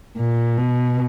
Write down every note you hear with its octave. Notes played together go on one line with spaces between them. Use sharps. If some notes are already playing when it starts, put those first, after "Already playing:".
A#2
B2